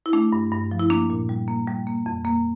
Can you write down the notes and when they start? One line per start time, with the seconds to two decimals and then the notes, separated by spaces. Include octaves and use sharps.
0.06 E4
0.13 A3 D4
0.32 G2
0.52 G2
0.71 F3
0.79 E4
0.90 A#3 D4
1.10 A#2
1.29 G3
1.48 A#3
1.67 G3
1.87 A#3
2.06 F2
2.25 A#3